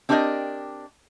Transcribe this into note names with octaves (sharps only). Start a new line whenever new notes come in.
C4 D4 G4 A#4 D5 D#5